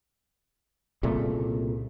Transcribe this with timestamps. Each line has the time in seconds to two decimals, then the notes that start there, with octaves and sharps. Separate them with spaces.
1.03 C2 A#2 C#3 A3